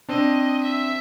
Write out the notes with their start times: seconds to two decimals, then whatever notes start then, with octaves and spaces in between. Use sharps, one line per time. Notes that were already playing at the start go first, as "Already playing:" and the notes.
0.09 C4 D4 D#5
0.63 E5